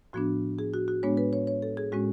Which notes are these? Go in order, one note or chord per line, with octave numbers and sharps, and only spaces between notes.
A2 F3 B3 D4 F#4
G#4
F#4
F#4
A2 G#3 B3 D4 C#5
B4
C#5
C#5
A4
G#4
A2 G#3 C#4 F#4